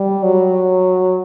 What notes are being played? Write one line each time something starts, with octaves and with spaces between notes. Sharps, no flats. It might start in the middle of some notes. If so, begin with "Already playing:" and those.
Already playing: G3
F#3